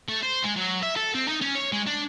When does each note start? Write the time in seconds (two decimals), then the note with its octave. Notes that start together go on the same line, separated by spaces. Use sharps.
0.09 A3
0.23 C5
0.44 G#3
0.56 F#3
0.83 E5
0.96 A4
1.15 C4
1.28 D#4
1.42 C#4
1.55 C#5
1.72 G#3
1.87 D4